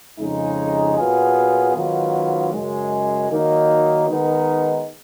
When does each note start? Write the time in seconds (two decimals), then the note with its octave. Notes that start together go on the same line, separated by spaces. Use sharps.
0.18 F2 C#3 G#3 D#4
0.96 A#2 F#3 B3 F4 G#4
1.74 G#2 D#3 F#3 B3 F4
2.52 F#2 C#3 G#3
3.30 D#3 F#3 A#3 D#4
4.08 D#3 G#3 B3 D#4